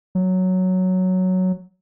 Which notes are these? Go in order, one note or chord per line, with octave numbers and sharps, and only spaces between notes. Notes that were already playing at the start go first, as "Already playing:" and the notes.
F#3